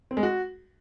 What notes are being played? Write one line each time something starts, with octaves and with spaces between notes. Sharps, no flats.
C4
G#3
F#4